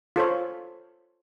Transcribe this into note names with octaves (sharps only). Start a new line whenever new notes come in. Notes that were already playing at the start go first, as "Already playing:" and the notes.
F4 A4 C5 C#5